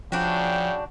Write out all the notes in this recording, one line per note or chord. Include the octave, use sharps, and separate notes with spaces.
C#3 F3 D4 F#4 G5